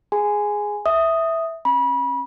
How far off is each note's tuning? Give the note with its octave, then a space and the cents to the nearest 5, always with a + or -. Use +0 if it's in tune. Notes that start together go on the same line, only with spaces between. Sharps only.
G#4 +0 G#5 +0 C6 -40
E5 -5 D#6 +0
C#4 -40 B5 -30